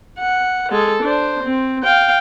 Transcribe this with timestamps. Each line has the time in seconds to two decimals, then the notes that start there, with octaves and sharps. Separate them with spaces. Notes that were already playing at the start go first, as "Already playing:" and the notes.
0.19 F#5
0.71 G#3 A4
1.03 D4 C5
1.43 C4
1.83 F5 G5